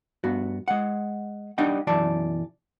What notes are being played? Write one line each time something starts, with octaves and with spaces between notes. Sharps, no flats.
G2 B3 F#4
G#3 F#5
G3 D4 D#4 D#5 F#5 G5
B1 F#2 E3 D5 A5